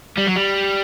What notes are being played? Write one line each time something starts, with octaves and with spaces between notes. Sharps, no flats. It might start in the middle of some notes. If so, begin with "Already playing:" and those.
G3
F#3
G3